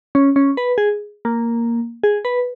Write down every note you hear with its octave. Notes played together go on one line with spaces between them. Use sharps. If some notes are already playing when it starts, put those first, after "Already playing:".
C#4
C#4
B4
G#4
A#3
G#4
B4